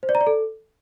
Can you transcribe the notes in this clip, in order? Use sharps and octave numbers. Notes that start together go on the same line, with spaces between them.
C5
D5
A#5
D5
A4